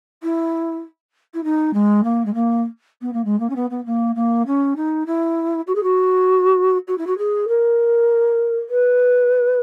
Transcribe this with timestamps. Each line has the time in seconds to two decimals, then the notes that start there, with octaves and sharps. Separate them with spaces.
0.22 E4
1.34 E4
1.43 D#4
1.73 G#3
2.03 A#3
2.25 G#3
2.34 A#3
3.01 B3
3.13 A#3
3.24 G#3
3.39 A#3
3.49 C#4
3.55 B3
3.70 B3
3.85 A#3
4.15 A#3
4.46 C#4
4.76 D#4
5.06 E4
5.67 F#4
5.75 G#4
5.83 F#4
6.87 F#4
6.97 E4
7.06 F#4
7.18 G#4
7.48 A#4
8.69 B4